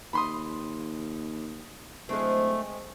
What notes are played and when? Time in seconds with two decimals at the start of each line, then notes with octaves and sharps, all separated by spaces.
0.13 D#2 B5 C6 D#6
2.09 D1 G#3 A3 C4